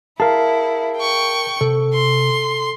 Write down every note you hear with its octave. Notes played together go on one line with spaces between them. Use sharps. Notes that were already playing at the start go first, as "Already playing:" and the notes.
E4 G#4 A#4 E5 F5 A5
G5 C#6
C3 A4
C6